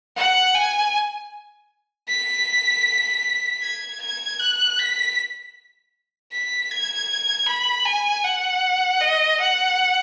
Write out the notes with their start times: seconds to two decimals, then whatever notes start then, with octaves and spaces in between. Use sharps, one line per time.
0.16 F#5
0.55 G#5
2.09 B6
3.62 G#6
4.01 G#6
4.39 F#6
4.79 B6
6.33 B6
6.71 G#6
7.48 B5
7.86 G#5
8.24 F#5
9.01 D#5
9.40 F#5